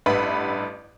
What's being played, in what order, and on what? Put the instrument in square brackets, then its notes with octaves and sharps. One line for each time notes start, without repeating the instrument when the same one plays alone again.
[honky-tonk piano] A1 G2 B4 E5 F#5 B5